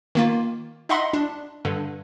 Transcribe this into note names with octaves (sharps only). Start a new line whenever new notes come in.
D#3 A#3 F4
D#4 D#5 E5 F#5 B5 C6
D4
G2 D3